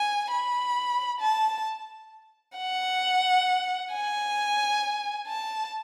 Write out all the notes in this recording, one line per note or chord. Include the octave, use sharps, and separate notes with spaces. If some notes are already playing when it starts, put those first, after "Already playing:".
Already playing: G#5
B5
A5
F#5
G#5
A5